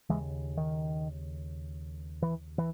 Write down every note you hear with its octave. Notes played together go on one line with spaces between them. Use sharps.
D#2 C#3 E3 G#3
D#3
E3
E3